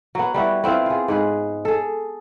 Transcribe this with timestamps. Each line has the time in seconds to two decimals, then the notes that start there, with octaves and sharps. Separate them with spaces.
0.15 F#3 B3
0.34 G3 B3 E4 F#4
0.64 B3 C4 E4 F4
0.86 F4 G#4
1.08 G#2 G#4 B4
1.65 G#4 A4